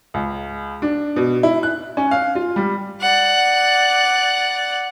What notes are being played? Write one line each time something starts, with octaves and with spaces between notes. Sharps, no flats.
C#2
D4
B2
E4
F#6
C#4
F5
F4
G3
D5 F#5